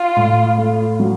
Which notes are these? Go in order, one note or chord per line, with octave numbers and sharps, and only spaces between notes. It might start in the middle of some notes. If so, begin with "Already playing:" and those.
Already playing: F4
A2
A3
F#3